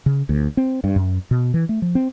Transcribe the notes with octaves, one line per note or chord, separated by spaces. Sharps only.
C#3
D2
C4
G2
F#2
B2
E3
A3
F3
C4